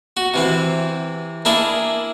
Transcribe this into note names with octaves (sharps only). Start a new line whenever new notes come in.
F#4
C3 E3 C4
A#3 D4 E4 G#4 E5